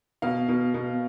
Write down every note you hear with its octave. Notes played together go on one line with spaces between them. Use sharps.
B2 F5
B2
B2